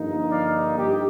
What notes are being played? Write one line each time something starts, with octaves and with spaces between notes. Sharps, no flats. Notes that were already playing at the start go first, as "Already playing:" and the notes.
Already playing: G2 D3 F3 A#3 D#4
D5 F5
G2 F3 G4